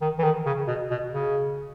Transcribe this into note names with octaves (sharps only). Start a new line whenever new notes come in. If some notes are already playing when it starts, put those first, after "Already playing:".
D#3
E3
D#3
C#3
B2
B2
C#3